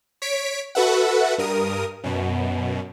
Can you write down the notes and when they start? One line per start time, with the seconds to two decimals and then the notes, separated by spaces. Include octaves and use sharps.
0.22 C#5 B6 D7
0.75 F#4 A4 B4 E5 F#5
1.38 G2 A#4 D#6
2.04 F#2 B2